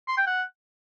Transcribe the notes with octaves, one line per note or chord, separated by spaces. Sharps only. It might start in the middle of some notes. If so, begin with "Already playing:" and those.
C6
G5
F#5